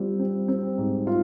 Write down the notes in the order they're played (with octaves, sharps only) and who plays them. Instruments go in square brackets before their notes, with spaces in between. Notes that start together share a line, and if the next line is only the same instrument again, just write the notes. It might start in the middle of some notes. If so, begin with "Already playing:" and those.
Already playing: [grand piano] G3 C4 F4
C4
C4
G#2
F4